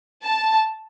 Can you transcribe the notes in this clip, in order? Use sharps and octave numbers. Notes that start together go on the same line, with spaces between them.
A5